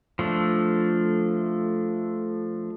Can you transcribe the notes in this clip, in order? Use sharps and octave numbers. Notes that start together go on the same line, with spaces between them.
F3 A3 D4